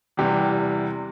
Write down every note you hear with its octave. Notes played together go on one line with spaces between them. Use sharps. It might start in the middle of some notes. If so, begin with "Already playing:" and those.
E2 C3 E3 G3 G4